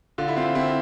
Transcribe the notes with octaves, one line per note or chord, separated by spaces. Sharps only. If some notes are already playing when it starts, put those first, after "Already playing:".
D3 F4
E4
C4 F4
C4 E4